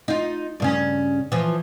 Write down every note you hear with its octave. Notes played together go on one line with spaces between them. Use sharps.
D#4 F4
G2 C#3 C#4
E3 F3